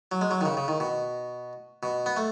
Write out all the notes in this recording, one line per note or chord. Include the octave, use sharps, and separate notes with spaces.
F#3
G#3
F#3
D#3
C#3
C#3
D#3
B2
B2
B3
A3